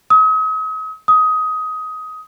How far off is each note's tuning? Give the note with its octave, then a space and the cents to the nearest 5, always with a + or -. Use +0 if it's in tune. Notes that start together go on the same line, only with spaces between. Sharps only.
D#6 +40
D#6 +15